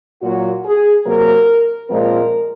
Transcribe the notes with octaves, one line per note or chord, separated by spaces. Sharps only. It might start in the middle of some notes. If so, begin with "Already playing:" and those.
A#2 F#3 A#3 F#4
G#4
C3 F#3 A#3 A#4
A#2 F3 G#3 C4 A#4